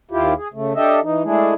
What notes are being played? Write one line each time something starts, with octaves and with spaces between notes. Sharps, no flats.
D#2 E4 F4 G4
G#4
C#3 A3
D4 G4 A4 D#5 E5
E3 D#4
G#3 A3 D4 E4 G#4